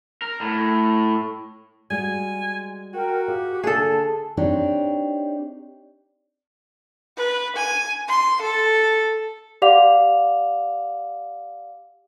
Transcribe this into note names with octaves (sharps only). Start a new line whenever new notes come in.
A#4
A2
G3 G#3 F#4 G#5
F#4 A#4 G5
F4 G4 G#4
D3 A#3 G#4 A4 A5
C4 D4 D#4 G4 C#5
B4
G#5
C6
A4
G4 D5 F5 F#5 D6 F7